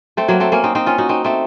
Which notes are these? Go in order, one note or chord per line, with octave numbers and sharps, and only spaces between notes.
A3 C4
F#3 A#3
A3 C4
A#3 C#4
C4 D#4
C4 D#4
C#4 F4
D#4 F#4
C4 D#4
A3 C4